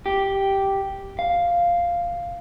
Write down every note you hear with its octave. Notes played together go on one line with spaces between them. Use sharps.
G4
F5